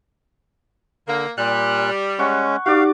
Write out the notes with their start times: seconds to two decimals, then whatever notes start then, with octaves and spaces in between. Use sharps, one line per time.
1.08 D3 A#3
1.38 A#2 G3 F#6
2.19 G#3 C#4 F#5 C#6
2.66 D#4 F#4 G4 D5 F5 D6